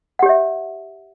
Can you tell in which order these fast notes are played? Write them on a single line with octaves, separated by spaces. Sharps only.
F#5 G4 C#5 E5